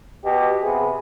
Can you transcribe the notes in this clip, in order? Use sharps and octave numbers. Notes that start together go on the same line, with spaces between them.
B2 G4
C3 B3 G#4